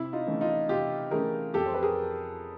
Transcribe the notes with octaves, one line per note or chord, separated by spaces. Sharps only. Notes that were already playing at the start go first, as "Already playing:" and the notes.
Already playing: C3 E4
D#4 F4
E3 A3 C#4
D#4 F4
C3 F4 G4
E3 A3 C#4 G#4 A#4
F2 G4 A4
C5
B4
G#4 A#4